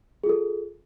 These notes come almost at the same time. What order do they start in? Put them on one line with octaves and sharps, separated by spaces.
G#4 F4 A4